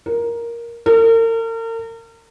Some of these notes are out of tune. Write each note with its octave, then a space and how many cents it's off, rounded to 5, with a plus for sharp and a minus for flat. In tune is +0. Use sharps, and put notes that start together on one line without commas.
A#4 +5
A#4 -40